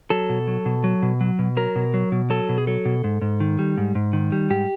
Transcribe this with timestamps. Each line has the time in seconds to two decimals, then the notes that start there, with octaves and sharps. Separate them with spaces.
0.10 F#3 A4
0.29 B2
0.47 F#3
0.66 B2
0.84 F#3
1.03 B2
1.21 F#3
1.39 B2
1.57 F#3 A#4
1.76 B2
1.94 F#3
2.12 B2
2.30 F#3 A4
2.49 B2
2.58 G#4
2.67 F#3 A4
2.85 B2
3.04 G#2
3.22 G#2
3.40 D#3
3.59 G3
3.78 G#2
3.95 G#2
4.13 D#3
4.32 G3
4.50 G#2 G4